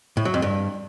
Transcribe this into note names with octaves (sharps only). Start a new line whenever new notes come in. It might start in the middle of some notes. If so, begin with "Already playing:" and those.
A2
F#3
F2
G2